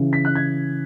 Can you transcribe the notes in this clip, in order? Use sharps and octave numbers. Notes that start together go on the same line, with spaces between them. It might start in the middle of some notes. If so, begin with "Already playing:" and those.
Already playing: C#3 E3
B6
F#6
G#6